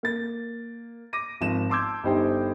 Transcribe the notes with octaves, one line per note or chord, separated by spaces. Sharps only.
A#3 A6
D6 A#6 D#7
G#1 F3 E7
A5 C6 D6 E6 G6 G#6
G1 D#4 G4 C5 G5